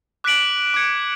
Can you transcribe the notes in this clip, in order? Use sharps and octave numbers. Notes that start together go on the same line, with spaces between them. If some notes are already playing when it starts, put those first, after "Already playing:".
D6 F#6 B6 D7 F#7
D6 G#6 C#7